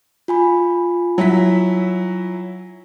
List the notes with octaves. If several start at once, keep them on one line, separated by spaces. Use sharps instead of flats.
F4 G#5 B5
F#3 E4 B6